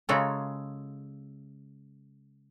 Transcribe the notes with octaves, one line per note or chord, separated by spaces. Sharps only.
C#3 G#3 F4 F#4 A4 A#5